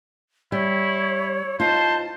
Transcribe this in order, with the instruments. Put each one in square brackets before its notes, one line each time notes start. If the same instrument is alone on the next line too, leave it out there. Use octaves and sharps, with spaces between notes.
[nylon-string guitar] G3 [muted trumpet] E4 [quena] C#5
[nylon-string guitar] D#4 F4 [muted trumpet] C5 [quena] A5